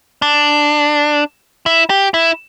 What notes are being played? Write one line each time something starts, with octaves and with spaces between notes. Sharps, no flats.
D4
E4
G4
E4